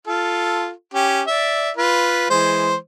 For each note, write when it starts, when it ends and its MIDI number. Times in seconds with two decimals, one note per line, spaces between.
0.07 0.70 65
0.07 0.70 69
0.94 1.22 61
0.94 1.22 67
1.27 1.70 74
1.27 1.70 76
1.77 2.27 65
1.77 2.27 71
2.30 2.75 52
2.30 2.75 56
2.30 2.75 72